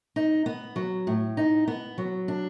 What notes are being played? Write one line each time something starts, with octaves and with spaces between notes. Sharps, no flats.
D#4
B3
F#3
A2
D#4
B3
F#3
D4